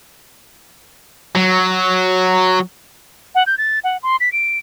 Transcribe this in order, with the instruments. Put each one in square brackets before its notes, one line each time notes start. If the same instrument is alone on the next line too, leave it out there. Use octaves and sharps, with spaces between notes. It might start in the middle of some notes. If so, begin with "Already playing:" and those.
[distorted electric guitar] F#3
[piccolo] F#5
G6
A6
F#5
C6
B6
D7